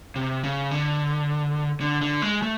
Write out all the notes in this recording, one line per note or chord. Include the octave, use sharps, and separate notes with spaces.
C3
C#3
D3
D3
D3
G#3
A3